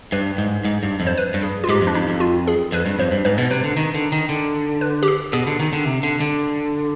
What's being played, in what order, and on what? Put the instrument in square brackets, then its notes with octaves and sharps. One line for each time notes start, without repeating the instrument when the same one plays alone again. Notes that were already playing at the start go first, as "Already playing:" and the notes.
[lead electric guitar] G2 [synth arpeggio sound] B4
[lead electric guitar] G#2
G#2
G2
F2
[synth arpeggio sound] C5
B4
[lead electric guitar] G2
[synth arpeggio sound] G#4
F4
[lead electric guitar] G#2 [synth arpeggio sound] G4
[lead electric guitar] F2
[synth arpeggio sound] D4
[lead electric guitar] F2 [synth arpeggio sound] D#4
[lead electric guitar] F2
[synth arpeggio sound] F4
G#4
[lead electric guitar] F2 [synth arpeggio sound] B4
[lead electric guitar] G2
[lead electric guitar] F2 [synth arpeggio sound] C5
[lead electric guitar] G2
[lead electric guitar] G#2 [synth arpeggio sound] B4
[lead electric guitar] B2
[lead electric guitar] C3 [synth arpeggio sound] B4
[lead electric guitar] D3
D#3
D3
D#3
D3
[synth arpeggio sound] B4
G4
G#4
[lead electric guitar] B2 [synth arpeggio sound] G#4
[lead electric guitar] D3
D#3
D3
C3
D3
D3